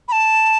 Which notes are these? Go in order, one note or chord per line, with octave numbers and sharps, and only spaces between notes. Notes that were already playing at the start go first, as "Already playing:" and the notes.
B5
A5